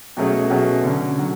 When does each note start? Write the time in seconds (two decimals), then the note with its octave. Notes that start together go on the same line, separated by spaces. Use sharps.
0.17 B2 F#3 A3 C#4 G#4
0.50 B2 F#3 A3 C#4 G#4
0.84 D3 F#3 C#4
1.18 D3 F#3